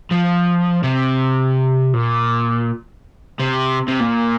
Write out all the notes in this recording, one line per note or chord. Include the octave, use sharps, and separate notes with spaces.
F3
C3
A#2
C3
C3
A#2